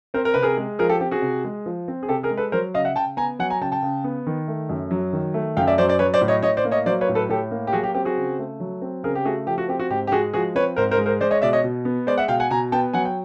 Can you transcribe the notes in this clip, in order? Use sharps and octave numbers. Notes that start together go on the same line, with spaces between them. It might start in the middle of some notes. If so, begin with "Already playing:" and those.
C4 A#4 C5
A#4
C3 B4
G#4 A#4
G#3
F3 G#4 A#4
G4 A4
C4 G4
F#4 G#4
C3
G#3
F3
C4
G#4
C3 G4 A4
G#4 A#4
G#3
A4 B4
F#3 A#4 C5
C#3 D#5 F5
E5 F#5
C#3 G5 A5
B3 G#5 A#5
F#3 F#5 G#5
G#5 A#5
C#3 G5 A5
G5 A5
C#3
B3
D#3
A3
F#2
F#3
D#3
A3
F#2 F5 G5
D5 E5
F#3 C5 D5
C5 D5
F#3 B4 C#5
C5 D5
A2
C#5 D#5
A2 C#5 D#5
C5 D5
A#3
C#5 D#5
F#3 C5 D5
B4 C#5
A2
A4 B4
A2 G4 A4
A#3
G4
F#3 F#4 G#4
G4
C4 G4
F#4 G#4
C#3
A3
F#3
C4
C#3 G#4 A#4
G4
A3 F#4 G#4
F3 G4
F#4
C4 G4
F#4
G#2 G4
G4
G#3 F#4 G#4
F3 F#4 G#4
C4 B4 C#5
G#2 A#4 C5
A#4 C5
G#3
A#4 C5
G#3 C5 D5
C#5 D#5
B2 D5 E5
C#5 D#5
B2
B3
G#3 C5 D5
E5 F#5
B2 F5 G5
F#5 G#5
B2 G#5 A#5
B3 G5 A5
F#3 F#5 G#5
G5